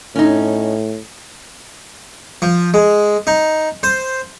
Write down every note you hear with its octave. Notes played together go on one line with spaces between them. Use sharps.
A2 C#4 D#4
F3
G#3
D#4
C5